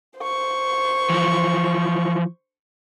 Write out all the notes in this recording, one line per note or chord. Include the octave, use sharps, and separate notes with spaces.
C5 C#6
E3 F3